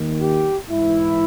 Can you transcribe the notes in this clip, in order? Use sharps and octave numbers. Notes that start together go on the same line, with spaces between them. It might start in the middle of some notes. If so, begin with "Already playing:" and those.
Already playing: D#2 D#3
G4
G#2 E3 E4